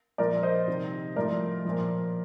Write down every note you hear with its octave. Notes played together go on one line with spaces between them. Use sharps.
A#2 F3 A#4 D5
C5 D#5
C3 D#3
A2 F3 A#4 D5
A#2 F3